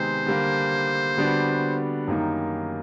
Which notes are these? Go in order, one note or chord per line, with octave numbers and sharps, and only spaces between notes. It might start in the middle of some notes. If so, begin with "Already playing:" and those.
Already playing: C3 D#3 G#3 B3 C5
D3 G3 A#3
D3 G3 B3 D4 F#4
F#2 D#3 G3 A#3 D#4